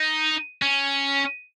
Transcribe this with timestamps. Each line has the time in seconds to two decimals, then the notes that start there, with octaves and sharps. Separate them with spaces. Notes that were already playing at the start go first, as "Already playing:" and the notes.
Already playing: D#4
0.62 C#4